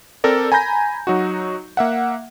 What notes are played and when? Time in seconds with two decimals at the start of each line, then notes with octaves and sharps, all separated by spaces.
0.24 C4 A4 A#4 D5
0.52 G#5 A#5 B5 G6 A#6
1.07 F#3 D#4 F#4
1.77 A#3 E5 F#5